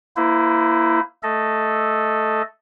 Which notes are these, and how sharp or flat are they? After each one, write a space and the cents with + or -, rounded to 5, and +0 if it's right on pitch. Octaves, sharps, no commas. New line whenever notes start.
A#3 +0 E4 +10 C5 -40
A3 +0 A4 +0 D#5 +0